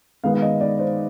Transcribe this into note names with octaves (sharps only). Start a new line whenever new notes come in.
D#3 G#3 B3 D#4 F5
F5
D#5
D5
C5